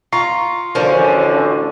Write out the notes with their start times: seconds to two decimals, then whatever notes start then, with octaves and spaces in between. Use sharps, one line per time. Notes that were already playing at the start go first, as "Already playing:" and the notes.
0.13 F4 A#5 C#6 C7
0.75 A1 D2 D3 F3 C#4 A#4 C5 D5